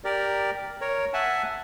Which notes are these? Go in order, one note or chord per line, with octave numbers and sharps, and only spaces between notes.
G4 A#4 D5
A#4 C#5
E5 F#5 G#5 A5